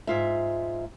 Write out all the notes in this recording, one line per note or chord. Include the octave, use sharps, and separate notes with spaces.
G#2 F4 E5